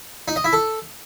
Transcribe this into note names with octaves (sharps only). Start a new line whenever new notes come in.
D#4
D#5
E4
A4